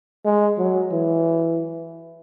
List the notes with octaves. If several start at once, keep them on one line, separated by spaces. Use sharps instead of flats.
G#3
F#3
E3